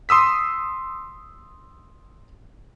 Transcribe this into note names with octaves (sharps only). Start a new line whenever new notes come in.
C6 D#6 E6 B6